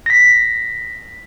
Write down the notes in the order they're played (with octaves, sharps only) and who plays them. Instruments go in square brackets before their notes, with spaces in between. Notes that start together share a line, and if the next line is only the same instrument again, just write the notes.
[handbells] A#6 B6